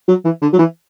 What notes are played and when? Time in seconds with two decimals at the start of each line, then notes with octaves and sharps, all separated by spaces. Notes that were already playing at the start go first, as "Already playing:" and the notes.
0.08 F#3
0.25 E3
0.42 D3
0.53 F#3
0.59 E3